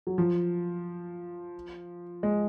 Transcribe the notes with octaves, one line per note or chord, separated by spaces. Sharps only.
F#3
F3
G#3